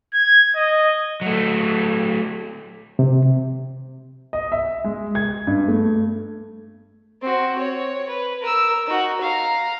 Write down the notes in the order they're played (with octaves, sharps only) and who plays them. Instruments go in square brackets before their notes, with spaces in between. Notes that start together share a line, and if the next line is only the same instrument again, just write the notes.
[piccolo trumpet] G#6
D#5
[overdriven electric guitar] F#3 A3
[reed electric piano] C3
[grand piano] D#5
E5
G#3
G#6
G2
A3
[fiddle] C4 F#4
C#5
B4
A#4 E6
D#4 F#4
F5 A#5